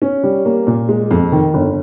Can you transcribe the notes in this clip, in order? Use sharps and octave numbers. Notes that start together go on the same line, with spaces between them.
C#4
G3
A#3
A#2
G#3
F2
D#3
G1